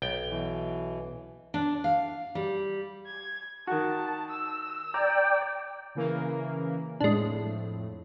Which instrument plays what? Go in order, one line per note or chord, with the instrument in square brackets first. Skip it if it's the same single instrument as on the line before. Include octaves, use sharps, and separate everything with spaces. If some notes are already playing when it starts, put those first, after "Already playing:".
[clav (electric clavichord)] B1 G5
[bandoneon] B2 E3
[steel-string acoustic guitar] D4
F5
G3
[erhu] G#6
[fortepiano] D#3 F#4 [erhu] A5
[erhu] E6
[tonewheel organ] D5 G5 [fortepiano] A#5
[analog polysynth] C#3 E3 A#3
[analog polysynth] F2 A2 [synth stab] G#3 D4